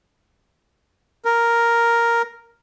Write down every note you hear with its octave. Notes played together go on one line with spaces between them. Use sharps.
A#4